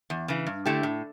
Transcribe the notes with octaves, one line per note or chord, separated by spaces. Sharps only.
E2
C#3 E3
G2
D3 A3 E4 G4
A2